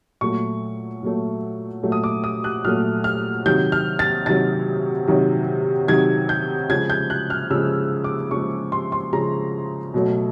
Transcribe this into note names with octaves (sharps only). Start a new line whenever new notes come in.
A#2 F#3 A3 C#6
A#2 F#3 A3
A#2 F#3 A3
D#6
D6
D#6
F#6
A#2 F#3 A3 F6
F6
C3 D#3 F#3 G6
F6
A6
C3 D#3 F#3 A6
C3 D#3 F#3
C3 D#3 F#3 G#6
G6
C#3 F3 G#3 G#6
G6
F#6
F6
C#3 F3 G#3 E6
D6
C#3 F3 G#3 C#6
C6
C6
C#3 F3 G#3 A#5
B2 F#3 A3